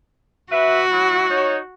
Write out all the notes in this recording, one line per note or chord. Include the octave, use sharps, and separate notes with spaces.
F#4 B4 E5
F#3 E4
D#4 C#5